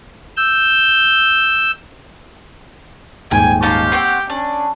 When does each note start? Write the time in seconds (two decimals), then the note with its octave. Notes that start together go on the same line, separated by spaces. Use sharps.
0.37 E6 G6
3.31 D#1 G#2 G5 G#5 G#6
3.62 C#4 D#4 F4 G4 A5
3.92 C4 C#5 F#5 G5 E6 C7
4.30 C#4 D4